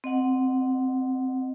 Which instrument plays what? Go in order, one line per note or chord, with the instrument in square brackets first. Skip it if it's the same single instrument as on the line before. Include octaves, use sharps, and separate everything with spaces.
[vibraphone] C4 D#5 F#5